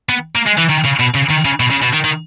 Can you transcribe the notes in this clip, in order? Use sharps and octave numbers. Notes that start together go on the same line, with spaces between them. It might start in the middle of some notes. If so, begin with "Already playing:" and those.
B3
A#3
G#3
E3
D#3
C#3
B2
C#3
D#3
C#3
B2
C#3
B2
D#3
D#3